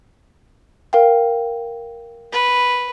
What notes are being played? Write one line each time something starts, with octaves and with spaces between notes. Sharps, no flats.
A#4 F5 G5
B4